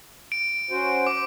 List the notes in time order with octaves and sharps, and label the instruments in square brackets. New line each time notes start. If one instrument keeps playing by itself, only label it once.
[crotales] D7
[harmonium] C#4 F#4 C5
[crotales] D6